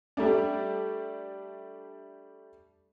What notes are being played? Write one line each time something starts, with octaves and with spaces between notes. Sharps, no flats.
G3 A3 D4